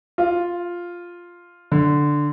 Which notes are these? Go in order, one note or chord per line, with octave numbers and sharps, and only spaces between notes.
F4
D3